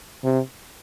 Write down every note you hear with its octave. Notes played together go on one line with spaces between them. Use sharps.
C3